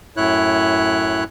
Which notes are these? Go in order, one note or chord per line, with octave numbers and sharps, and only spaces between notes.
F#2 A2 E4 C#5 F#6